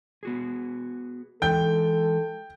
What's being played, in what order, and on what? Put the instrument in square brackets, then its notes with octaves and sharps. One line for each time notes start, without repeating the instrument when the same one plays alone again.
[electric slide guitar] B3 F#4 G#4
[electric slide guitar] E3 G#3 D#4 [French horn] A4 [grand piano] G5 G6